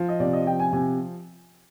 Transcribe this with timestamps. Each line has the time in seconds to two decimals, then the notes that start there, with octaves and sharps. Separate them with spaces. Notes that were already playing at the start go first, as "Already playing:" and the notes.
Already playing: F3
0.09 D#5
0.20 C3 D5
0.33 D#5
0.46 F3 G5
0.60 G#5
0.73 C3 G#5